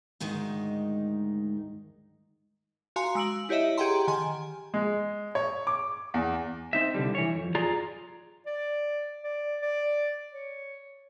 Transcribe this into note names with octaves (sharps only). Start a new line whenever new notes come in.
D2 G#2 D#3 G#3 D#4
F#4 F5 G#5 A#5 C6 F#6
G#3 E6 D7 F#7
E4 G4 C#5 D#5 E5
G4 G#4 F#5 G5 A#5 C6
D#3 G#5 C6
G#3
C#5
D6
E2
C4 D#4 E5
C2 G#2 D3 G3
E3 C#5
F2
F4 G#4 D5 A#5
D5
D5
D5
C#5